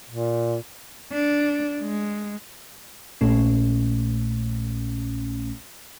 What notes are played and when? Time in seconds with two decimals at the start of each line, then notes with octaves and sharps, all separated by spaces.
0.09 A#2
1.12 D4
1.81 G#3
3.21 A#1 A#2 A3 C#4